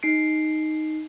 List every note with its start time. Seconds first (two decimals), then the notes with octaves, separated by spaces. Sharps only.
0.03 D#4 C7 D7